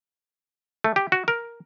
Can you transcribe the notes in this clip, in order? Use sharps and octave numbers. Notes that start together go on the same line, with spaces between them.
A3
G4
F#4
A#4